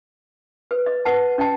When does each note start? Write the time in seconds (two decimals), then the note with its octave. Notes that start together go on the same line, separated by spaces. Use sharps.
0.71 B4
0.86 D#5
1.05 B4 F#5 A5
1.38 C#4 D#5 G5 A5